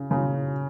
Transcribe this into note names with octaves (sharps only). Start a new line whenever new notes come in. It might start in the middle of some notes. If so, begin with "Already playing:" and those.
Already playing: C#3
C#3